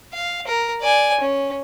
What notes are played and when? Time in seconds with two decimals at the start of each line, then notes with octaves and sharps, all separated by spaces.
0.13 F5
0.47 A#4
0.82 D5 G#5
1.20 C#4